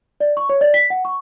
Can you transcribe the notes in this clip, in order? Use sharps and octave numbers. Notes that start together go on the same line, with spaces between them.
D5
C#6
C#5
D5
B6
F#5
C#6